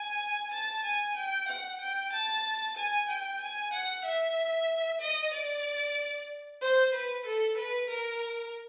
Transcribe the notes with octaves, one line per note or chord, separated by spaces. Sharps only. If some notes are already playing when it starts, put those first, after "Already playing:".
Already playing: G#5
A5
G#5
G5
F#5
G5
A5
G#5
G5
G#5
F#5
E5
D#5
D5
C5
B4
A4
B4
A#4